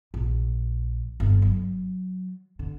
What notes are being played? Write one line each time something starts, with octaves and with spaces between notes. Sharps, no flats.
A#1
G1
F#3
D3